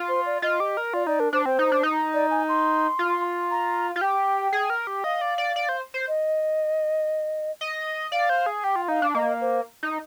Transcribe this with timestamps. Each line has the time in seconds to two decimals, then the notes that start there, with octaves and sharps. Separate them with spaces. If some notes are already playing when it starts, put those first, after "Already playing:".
Already playing: F4
0.08 C5
0.26 D5
0.42 F4 D#5
0.60 G4
0.77 A#4
0.94 F4 D5
1.07 D#4 D5
1.20 D4 A#4
1.33 D4 C5
1.46 C4 C5
1.59 D#4
1.72 D4
1.83 D#4
2.14 D5
2.30 G#5
2.48 C6
2.99 F4
3.51 A#5
3.96 F4
4.01 G4 G5
4.53 G#4
4.70 A#4
4.87 G4
5.04 D#5 F5
5.21 D5
5.38 D5
5.56 D5
5.69 C5
5.94 C5
6.08 D#5
7.61 D#5
8.12 D5 F5
8.30 C5
8.46 G#4
8.63 G4 G5
8.76 F4
8.88 D#4 F5
9.02 D4
9.15 A#3 D#5
9.41 C5
9.83 D#4